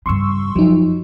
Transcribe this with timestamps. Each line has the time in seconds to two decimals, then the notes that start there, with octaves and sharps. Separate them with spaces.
0.06 G2 C#3 C6 C#6 E6
0.56 F2 F3 F#3 D#4